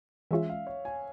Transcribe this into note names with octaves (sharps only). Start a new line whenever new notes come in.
E3 G#3 C#4 F4 E5
F5
C#5
G#5